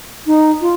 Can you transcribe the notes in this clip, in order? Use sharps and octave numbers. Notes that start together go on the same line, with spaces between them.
D#4
F4